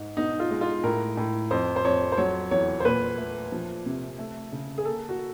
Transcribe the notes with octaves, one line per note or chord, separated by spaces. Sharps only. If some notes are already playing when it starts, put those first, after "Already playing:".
Already playing: G#2
B2 D#4
F4
G#3
F4
A2 A#4
A2
F2 C5
C5
F2 C#5
C5
F#3 C#5
E2 C#5
C5
A#2 B4
A3
F3
C3
A3
C#3
G#4
A#3 A4
F#4